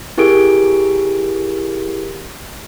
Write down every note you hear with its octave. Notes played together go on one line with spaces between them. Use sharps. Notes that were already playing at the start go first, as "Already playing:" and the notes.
E4 G4 G#4 A#4 D7